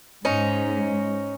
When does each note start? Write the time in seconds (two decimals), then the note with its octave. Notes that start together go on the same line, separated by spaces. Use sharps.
0.25 G#2 C#4 D#4